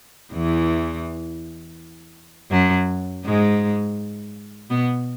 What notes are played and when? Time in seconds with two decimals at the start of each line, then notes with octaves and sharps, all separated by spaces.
0.33 E2 E3
2.51 F#2 F#3
3.24 G#2 G#3
4.70 B2 B3